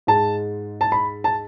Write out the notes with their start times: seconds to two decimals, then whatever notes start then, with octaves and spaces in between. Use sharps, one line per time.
0.07 G#2 G#3 A5
0.81 A5
0.92 B5
1.24 A5